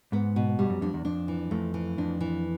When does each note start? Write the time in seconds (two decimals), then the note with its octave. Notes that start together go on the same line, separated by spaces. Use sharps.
0.12 G#2 B3
0.36 B2
0.59 G2 G3
0.70 F#2
0.81 F2 D4
0.94 E2
1.05 F2 D4
1.28 E3
1.51 F2 A3
1.74 E3
1.98 F2 D4
2.21 E3